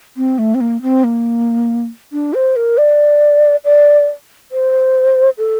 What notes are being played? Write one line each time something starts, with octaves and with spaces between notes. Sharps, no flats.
C4
A3
C4
A#3
C4
A#3
D4
C5
A#4
D5
D5
C5
A4